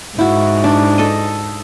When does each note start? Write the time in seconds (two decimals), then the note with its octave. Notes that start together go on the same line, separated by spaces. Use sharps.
0.19 G#2 E4 F#4
0.64 D4
0.98 A4 D#5